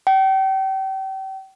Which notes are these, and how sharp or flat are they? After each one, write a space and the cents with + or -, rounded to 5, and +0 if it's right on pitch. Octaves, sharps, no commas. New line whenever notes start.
G5 -35